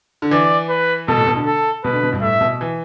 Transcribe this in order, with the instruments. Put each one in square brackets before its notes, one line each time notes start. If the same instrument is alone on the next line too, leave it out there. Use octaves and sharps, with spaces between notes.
[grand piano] D3
[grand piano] E3 [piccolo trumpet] D5
[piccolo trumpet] B4
[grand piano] B2 [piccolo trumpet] A4
[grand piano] A2
B2
D3
[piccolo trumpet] A4
[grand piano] B2 [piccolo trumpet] B4
[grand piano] D3
B2
G2
[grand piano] A2 [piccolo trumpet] E5
[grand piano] B2
E3